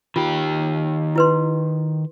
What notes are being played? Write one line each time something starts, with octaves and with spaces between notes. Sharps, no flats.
D#3 F4 G4
E4 B4 C6